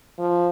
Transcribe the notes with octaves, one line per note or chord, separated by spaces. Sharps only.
F3